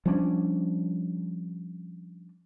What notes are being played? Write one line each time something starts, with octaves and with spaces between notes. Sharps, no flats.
F3 G3 C#4 D4